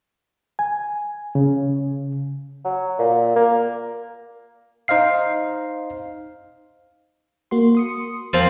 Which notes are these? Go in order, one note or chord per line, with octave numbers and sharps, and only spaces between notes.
G#5
C#3
F#3
A#2
A#3
D#4 C5 D#5 F5 C7
A#3 F#4 C6
C6 D#6 C#7
E2 F3 C4 F4 A#4 C5